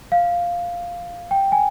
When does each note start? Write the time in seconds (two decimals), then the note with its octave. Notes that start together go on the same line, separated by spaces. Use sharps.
0.12 F5
1.31 G5
1.52 G#5